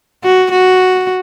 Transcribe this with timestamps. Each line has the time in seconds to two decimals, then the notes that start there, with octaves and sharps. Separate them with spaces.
0.23 F#4
0.52 F#4